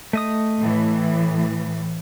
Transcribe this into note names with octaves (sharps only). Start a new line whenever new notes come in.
A3 D#5 D#6
A2 E3